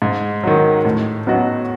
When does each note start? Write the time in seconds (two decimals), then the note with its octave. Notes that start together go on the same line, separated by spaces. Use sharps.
0.02 G#2
0.43 D#3 F#3
0.85 A2
1.27 F#3 B3 D#4 F#4